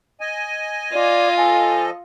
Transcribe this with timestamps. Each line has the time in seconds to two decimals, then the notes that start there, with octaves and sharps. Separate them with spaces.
0.21 D#5 G#5
0.93 F4 D5
1.37 F3 A4 D#5 G#5